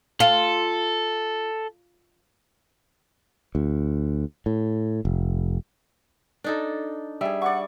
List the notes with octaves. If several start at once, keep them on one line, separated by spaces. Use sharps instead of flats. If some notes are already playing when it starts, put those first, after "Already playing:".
F4 A4
D2
A2
F1
D4 D#4 A4
G3 G#4 E5
D5 F#5 C#6